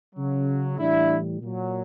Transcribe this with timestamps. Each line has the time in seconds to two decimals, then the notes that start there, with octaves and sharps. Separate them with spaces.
0.15 C#3 F#3
0.78 A2 E3 G3 D4 E4
1.42 A#2 F#3